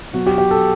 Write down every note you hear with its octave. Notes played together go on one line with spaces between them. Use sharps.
B2 F#3 F#4
G4
G4
A4